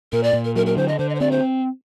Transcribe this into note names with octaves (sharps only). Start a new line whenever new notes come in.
A#2 A#4
D5
A#2
A#4
F#3 A#4
A#4
D3 C5
D#5
D3 C5
D#5
C5
C4 D5
C5